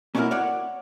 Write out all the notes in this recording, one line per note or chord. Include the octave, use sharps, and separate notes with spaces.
A#3 C#4 D4 E4 F#4 A#4
C#5 D5 F#5